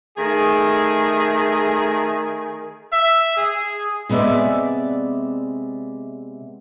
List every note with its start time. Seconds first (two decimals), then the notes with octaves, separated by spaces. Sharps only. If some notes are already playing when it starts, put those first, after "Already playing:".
0.17 D#3 A3 G#4
2.92 E5
3.37 G#4
4.09 C3 G#3 B3 D5 E5